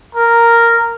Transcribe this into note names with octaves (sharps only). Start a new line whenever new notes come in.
A#4